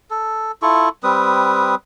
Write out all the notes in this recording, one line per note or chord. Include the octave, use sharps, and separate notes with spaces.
A4
E4 F4 A4 C#6
G3 C4 B4 D#6